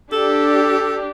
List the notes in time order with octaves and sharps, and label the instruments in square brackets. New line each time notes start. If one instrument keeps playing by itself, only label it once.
[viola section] D4 G4 [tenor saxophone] A4